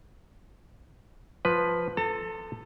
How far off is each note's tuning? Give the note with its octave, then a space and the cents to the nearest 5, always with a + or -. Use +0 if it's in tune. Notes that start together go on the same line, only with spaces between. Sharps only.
F3 +0 B4 +5
A4 +0 A5 +40